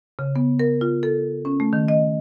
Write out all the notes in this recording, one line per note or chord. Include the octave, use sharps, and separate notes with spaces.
C#3
B3
A#4
F4
A4
C#4
A3
D#3
D#5